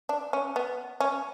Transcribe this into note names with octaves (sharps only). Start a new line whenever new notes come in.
D4
C#4
B3
C#4